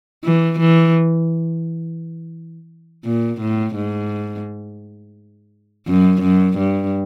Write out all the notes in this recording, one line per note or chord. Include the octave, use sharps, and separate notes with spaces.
E3
E3
A#2
A2
G#2
F#2
F#2
G2